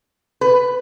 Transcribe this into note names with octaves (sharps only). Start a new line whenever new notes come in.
B4